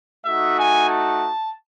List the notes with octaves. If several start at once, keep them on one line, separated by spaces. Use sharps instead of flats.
A3 D#4 F#4 E5
G#5
A5